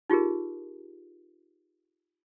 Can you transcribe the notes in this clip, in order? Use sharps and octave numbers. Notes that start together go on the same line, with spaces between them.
D#4 F4 G4 G#4 A#4